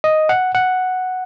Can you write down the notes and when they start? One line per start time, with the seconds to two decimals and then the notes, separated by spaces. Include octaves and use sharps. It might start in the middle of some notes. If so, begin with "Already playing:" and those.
0.04 D#5
0.29 F#5
0.55 F#5